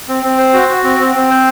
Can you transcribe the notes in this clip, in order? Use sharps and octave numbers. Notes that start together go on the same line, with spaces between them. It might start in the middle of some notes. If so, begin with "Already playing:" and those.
C4
C4
C5
F#4
F#4
C4
C4
C4
C5